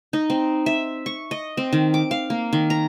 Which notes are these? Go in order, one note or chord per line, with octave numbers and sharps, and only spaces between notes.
D#4
C4
E5
C#6
D#5
C4
D#3
D6
F5
A#3
D#3
A#5